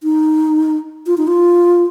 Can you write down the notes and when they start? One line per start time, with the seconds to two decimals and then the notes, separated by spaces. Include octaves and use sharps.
0.03 D#4
1.07 F4
1.18 D#4
1.27 F4